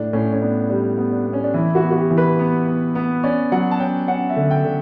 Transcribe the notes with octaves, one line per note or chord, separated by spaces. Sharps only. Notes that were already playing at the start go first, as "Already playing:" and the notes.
Already playing: A2 D4
A2 C#4
C#4
B3 D4
G3 D4
B3
D4
B3
C#4
D4
E3 E4
F#4
B3
F#4
G4
E3
B4
B3
B3
B3
C#4 D5
F#3 F#5
A5
C#4 G5
C#4 F#5
E5
D3
G5
D3